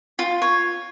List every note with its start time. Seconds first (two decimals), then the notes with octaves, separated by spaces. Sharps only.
0.19 F4
0.42 C#5